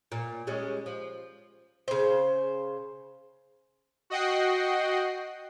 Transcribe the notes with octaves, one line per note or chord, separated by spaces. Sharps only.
A#2
G3 G#3 C#4
F3
C#3 C5
F#4 D#5 F#5 G5 C7